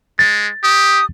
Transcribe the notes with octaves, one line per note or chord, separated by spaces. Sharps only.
G#3 A6
G4 D#6